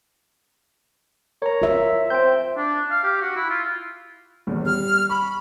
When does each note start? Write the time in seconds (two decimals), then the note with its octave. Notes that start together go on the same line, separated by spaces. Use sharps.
1.42 A#4 C#5 A#5
1.62 F4 E5
2.10 C4 G5 G6
2.56 D4
2.91 F5
3.04 G4
3.21 F#4
3.36 E4
3.50 F4
4.47 G1 E2 B3
4.66 G3 F6
5.09 B5 C#6